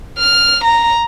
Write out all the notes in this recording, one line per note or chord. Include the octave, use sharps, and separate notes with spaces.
F6
A#5